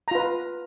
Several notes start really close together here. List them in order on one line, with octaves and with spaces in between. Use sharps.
A#5 F4 B4